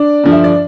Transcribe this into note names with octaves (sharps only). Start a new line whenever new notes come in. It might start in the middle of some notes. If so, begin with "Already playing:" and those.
Already playing: D4 D5
G2 D3 F3
E5
D5